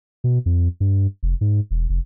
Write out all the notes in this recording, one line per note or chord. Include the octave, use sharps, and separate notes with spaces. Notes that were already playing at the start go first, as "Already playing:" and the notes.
B2
F2
G2
F1
G#2
E1
F1